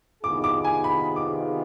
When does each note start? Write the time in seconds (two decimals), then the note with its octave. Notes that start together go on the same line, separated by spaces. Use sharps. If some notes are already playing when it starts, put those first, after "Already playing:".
0.23 C3 D#3 B3 F4 G#4 D6
0.44 D6
0.65 G#5
0.84 B5
1.16 D6